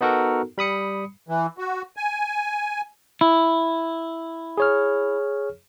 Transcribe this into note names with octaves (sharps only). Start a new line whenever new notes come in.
B3 D#4 F#4 A4 A#4
G3 B5 D#6 C#7
E3
F#4
G#5
E4
G#4 C#5 F6